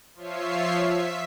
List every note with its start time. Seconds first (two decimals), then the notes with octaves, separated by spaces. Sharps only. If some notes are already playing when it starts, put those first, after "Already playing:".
0.15 F3 F4 C#5 E5 C7
0.87 E5 B6